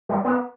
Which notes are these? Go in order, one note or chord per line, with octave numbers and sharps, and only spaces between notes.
G3
B3